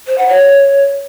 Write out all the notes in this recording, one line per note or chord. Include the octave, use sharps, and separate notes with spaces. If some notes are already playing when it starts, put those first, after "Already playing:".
C5
F#5
C#5